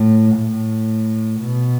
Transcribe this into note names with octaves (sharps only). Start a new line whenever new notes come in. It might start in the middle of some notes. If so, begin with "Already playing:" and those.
Already playing: A2
A2
B2